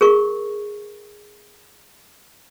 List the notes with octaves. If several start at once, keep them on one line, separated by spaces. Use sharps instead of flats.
G#4 A#4 C#6